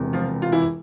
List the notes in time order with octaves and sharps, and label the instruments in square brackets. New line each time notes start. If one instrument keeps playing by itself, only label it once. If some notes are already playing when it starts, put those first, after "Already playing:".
Already playing: [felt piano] E1 E2 C3
[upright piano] F3 F4
F4
E3 E4